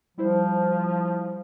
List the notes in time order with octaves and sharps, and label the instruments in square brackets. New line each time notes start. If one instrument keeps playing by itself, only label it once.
[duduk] F3 [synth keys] G3 E4 C5